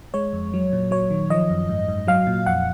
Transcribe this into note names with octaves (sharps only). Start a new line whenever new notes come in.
G#3 C#5
F2
F#3
A#2
F#3 C#5
D#3
F3 D#5
F#2
G#2
G#2
F#3 F5
A#2
F2 F#5